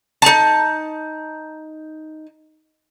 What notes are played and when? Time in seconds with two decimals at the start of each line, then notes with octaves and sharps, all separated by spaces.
0.22 D#4 A5